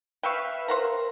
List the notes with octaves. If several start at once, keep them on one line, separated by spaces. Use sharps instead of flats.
B4 E5 F5 G5 C#6
A#4 C5 F#5 A#5